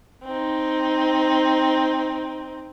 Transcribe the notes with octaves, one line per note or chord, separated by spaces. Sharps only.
C4 D#4